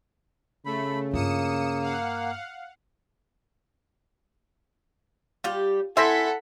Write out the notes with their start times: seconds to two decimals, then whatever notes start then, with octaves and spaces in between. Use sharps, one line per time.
0.66 C#3 A3 B5
1.14 G2 A#3 F4 D#6 C#7 E7
1.82 F5 F#5
5.44 G3 F4 G4
5.97 C4 E4 A4 C5 E5 F#5 G#5 B6